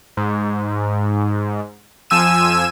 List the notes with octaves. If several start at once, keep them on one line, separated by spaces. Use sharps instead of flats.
G#2
F2 F3 G#5 E6 D#7 E7